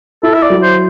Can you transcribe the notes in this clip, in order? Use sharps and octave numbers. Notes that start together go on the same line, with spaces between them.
E4 A4
E5
D5
F#3
C5